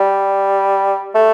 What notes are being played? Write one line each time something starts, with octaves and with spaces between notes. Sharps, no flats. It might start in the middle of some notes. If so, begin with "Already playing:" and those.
Already playing: G3
A3